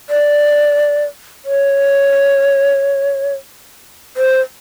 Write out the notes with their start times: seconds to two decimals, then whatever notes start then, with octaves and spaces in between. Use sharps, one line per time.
0.10 D5
1.45 C#5
4.17 C5